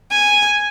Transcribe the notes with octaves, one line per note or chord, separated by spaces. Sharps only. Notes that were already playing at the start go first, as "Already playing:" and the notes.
G#5